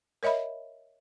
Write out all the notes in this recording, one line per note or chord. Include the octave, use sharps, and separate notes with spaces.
A#4 C#5 D#5 E5 B5